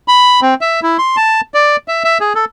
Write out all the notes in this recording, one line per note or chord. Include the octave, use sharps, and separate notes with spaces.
B5
C4
E5
E4
C6
A5
D5
E5
E5
G#4
A4